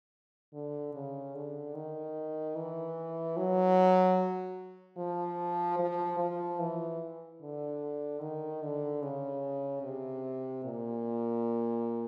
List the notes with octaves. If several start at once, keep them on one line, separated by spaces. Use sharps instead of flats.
D3
C#3
D3
D#3
E3
F#3
F3
F3
F3
E3
D3
D#3
D3
C#3
C3
A#2